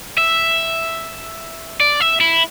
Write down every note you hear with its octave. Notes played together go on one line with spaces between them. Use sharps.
E5
D5
E5
E4